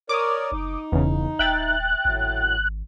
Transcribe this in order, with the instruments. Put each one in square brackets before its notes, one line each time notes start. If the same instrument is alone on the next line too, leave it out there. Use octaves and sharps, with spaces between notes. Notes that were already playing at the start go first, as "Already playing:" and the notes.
[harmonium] A#4 C#5 D5 [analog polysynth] D6 D#6
[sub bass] F#1 [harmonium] D#4
[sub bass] E1 [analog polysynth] E2 C#3
[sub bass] D#1 [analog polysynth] E5 G5 A6 [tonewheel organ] F#6
[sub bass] G#1 [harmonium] A2 F#3